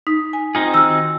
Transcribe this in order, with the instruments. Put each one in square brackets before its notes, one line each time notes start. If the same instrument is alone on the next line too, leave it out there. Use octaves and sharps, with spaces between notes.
[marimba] D#4 [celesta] B6
[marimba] G#5
[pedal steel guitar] C4 D#4 G#4 [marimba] F4
[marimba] D#3 F#4 F6 [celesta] E6